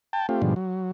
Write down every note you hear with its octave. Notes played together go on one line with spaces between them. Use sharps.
G5 A5
A3 C4 F4 G4
G#2 B2 D3 F3 G3
F#3